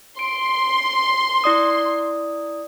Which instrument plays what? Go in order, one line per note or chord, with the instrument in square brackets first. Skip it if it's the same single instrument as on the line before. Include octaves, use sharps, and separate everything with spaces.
[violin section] C6 [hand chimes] D7
[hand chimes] E4 D5 D#6